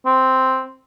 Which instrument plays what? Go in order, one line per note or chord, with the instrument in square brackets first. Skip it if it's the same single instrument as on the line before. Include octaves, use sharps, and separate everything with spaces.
[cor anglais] C4